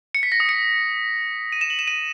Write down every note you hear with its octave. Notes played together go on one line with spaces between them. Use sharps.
C#7
B6
A#6
D#6
C#7
D#7
E7
F#7
E7
D#7